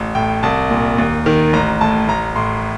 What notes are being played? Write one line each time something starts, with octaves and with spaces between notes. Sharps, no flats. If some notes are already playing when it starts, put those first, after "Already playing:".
Already playing: A1
A2 G5
C2 A5
A#2
D#2
D#3
A1 A#5
A2 A5
A1 A#5
A2 C6